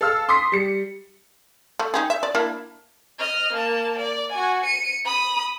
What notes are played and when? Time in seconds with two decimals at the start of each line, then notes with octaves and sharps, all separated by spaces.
0.01 A4 F5 E6 F6
0.29 C6 D6 D#6 B6 C7
0.52 G3 C#7
1.79 A3
1.94 D#4 G4 G#4
2.10 E5
2.23 D5
2.35 A#3 D4 E4
3.18 D#5 F6
3.53 A#3 A5
3.98 D5
4.32 F#4 G#5
4.64 C#7 D#7
5.05 B5 D#6